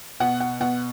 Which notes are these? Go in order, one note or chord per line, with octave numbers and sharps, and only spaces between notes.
B2 F#5
F#5
B2 F#5